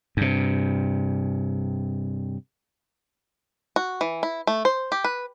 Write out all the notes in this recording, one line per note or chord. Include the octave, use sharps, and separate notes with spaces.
G2 C3
F#4
E3
E4
A3
C5
G4
B4